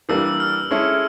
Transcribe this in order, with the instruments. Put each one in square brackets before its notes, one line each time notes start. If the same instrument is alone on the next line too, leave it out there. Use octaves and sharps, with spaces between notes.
[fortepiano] E3 G3 A#3 D4 [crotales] E6
[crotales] E6
F6
[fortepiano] G#3 C#4 E4 A4